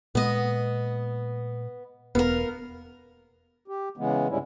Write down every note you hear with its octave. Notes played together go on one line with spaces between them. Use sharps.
A#2 G#3 B3 D#5
E1 B3 A#4 F5
G4
C#3 E3 G#3 B3
G2 C3 G3 G#3 C#4 E4